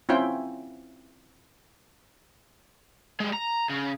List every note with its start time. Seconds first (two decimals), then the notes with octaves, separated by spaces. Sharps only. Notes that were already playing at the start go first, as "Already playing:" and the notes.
0.09 C4 C#4 E4 F4 G5
3.20 G3 G#3
3.33 A#5
3.70 C#3